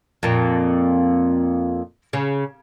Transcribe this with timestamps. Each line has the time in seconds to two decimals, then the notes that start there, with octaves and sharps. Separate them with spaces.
0.23 F2 A#2
2.13 C#3